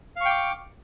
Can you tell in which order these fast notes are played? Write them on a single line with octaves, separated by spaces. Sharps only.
F5 C#6 G5 D6